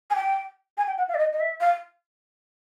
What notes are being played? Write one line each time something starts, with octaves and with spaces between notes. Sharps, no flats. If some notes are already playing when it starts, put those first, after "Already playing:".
G#5
G5
G#5
G5
F#5
F5
D5
D#5
D#5
E5
F5